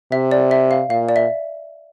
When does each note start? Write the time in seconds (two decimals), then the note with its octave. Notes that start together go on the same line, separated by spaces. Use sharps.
0.12 C3 E5
0.31 D5
0.51 E5
0.71 F5
0.90 A#2 F5
1.09 D5
1.16 E5